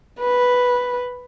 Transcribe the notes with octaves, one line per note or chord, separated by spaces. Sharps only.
B4